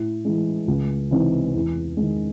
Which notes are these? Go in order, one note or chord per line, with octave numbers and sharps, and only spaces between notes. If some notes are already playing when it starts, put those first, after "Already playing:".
Already playing: A2
E3 G#3
C#2
C3 E3 C4 D#4
E2
G#3
D#3